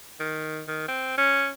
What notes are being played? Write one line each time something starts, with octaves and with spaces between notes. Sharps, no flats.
D#3
D#3
C4
C#4